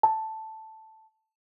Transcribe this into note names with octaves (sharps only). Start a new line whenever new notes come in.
A5